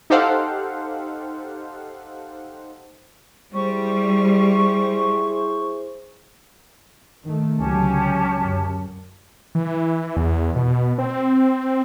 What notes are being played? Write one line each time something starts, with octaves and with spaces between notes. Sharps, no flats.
D#4 G4 A4 C5 F5 F#5
G3 E4 G#4 C5 C#6
D#3 A3
C#2 D3 F#3 C#4 G4 A5
F#2
E3
E2
B2
C4